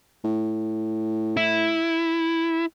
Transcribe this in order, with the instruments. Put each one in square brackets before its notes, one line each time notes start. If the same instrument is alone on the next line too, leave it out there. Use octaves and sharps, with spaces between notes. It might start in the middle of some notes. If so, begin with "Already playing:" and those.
[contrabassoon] A2
[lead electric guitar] E4